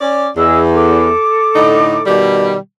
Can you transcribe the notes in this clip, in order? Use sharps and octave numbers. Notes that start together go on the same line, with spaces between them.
C#4 D5
E2 G#4 D#5 E6
A4 D6
A2 D3 D#4
B2 D#3 G3